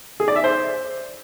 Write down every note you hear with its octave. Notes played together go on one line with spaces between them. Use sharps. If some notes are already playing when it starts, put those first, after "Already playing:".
G#4
D5
E5
C5